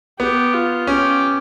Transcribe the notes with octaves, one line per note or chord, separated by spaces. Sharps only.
B3 G4
F4
C#4 G4